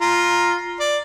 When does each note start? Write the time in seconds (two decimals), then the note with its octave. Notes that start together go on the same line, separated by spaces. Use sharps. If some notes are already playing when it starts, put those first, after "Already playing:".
0.01 F4 A#5
0.80 D5